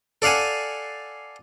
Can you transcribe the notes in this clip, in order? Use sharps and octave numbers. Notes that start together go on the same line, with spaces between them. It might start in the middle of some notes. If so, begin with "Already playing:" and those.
A4 D5 F5 F#5 G#5